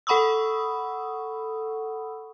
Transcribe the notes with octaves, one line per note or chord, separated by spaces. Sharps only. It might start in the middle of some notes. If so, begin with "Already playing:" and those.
A4 F#5 B5 C#6 D#6 E6